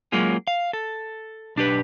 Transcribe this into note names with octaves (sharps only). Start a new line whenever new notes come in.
F#3 G#3 A#3 C#4 F4 G#4
F5
A4
B1 D4 G4 B4